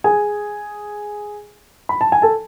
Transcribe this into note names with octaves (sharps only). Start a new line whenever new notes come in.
G#4 G#5
B5
A5
G#5
A4 A5